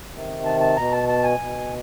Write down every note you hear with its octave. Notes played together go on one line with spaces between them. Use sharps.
C3 D#3
A5
A5
B2 A#5
A5
A5
G#5
B2